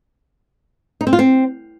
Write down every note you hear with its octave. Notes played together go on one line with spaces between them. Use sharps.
D#4
C4
F4
C4